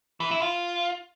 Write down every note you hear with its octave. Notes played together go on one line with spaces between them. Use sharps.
E3
E4
F4